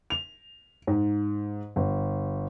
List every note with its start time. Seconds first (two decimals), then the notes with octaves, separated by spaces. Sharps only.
0.10 F7
0.87 G#2
1.76 G1